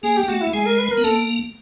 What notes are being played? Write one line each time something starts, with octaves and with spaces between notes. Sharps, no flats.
A#3 G#4
G4
A#3
A3 F#4
E4
G#3 G#4
A#4
B4
A#4
B3
A#3 A4